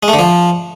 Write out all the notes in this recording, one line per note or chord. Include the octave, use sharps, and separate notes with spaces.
G#3
A3
D3
F3